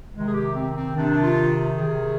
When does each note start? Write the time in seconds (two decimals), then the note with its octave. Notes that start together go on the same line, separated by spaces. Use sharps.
0.13 C3 D#3 G#3
0.28 G#4
0.34 G4
0.55 C4
0.75 C4
0.96 C3 D#3 D4
1.23 F4
1.77 C3 D#3 G#4